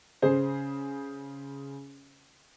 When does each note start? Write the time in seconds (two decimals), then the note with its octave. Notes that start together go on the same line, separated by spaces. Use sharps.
0.22 C#3 G#4 C5